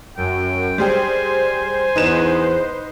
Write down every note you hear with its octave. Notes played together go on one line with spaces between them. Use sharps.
F#2 G5
G3 G#4 C5 G5 G#5
E2 D#4 B4 E7